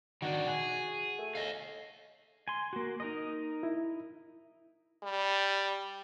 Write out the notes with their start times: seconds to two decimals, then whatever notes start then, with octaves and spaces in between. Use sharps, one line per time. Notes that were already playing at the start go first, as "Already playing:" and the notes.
0.22 D#3 D4 F#4
0.47 G#4
1.19 A3
1.35 D#5 F5
2.48 G#5 C6
2.73 A#3 F#4
3.00 D#4 A#4 D#5
3.63 E4
5.03 G3